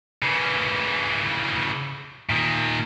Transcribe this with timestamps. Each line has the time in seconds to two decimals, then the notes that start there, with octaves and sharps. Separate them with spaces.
0.22 C#3 E3
2.30 A#2 D#3